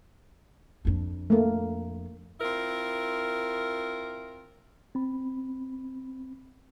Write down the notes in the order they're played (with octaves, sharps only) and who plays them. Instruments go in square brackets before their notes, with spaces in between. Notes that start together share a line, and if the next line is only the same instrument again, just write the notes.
[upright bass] F2 D4
[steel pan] A3 A#3
[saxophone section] C4 E4 F4 A#4
[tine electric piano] C4 B5